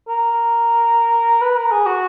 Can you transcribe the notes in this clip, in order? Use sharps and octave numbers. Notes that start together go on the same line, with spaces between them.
A#4
B4
A#4
G#4
F#4